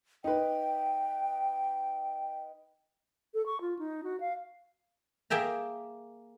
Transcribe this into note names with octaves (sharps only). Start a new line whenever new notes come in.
D#4 B4 G5
A4
C#6
F4
D#4
F#4
F5
A#3 G#4 E5 G5 A#5